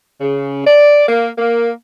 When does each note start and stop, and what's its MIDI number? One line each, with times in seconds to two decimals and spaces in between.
0.21 0.64 49
0.66 1.04 74
1.08 1.29 58
1.38 1.71 58